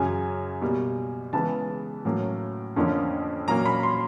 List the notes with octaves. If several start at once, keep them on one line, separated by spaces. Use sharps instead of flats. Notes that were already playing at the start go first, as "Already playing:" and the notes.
Already playing: F#2 C#3 F#3 G#5
B2 G3 A#3
C#3 E3 G#3 B3 A5
A2 F#3 A#3 C#4
F2 D3 F3 A#3 C#4
A#2 F#3 A#3 C#4 A#5
B5
C6